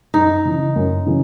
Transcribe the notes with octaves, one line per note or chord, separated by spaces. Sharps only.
F#2 D#4
C#3 E3
F#2
C#3 E3